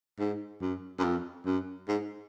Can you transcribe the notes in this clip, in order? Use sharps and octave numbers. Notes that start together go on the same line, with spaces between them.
G#2
F#2
F#2
F2
F#2
G#2